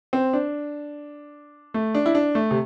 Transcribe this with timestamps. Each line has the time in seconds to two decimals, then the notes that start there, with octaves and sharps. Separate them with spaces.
0.13 C4
0.33 D4
1.74 A3
1.95 D4
2.06 E4
2.15 D4
2.35 A3
2.51 C3